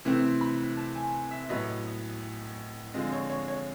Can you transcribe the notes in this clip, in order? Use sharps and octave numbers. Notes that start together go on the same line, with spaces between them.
C3 E3 A3 C4
B5
A5
G#5
E5
A2 F#3 B3 D#5
D3 F3 G#3 C4 D#5
C#5
C#5
C#5